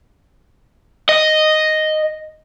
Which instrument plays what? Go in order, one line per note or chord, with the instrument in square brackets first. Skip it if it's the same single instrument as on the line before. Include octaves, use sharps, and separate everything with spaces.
[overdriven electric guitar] D#5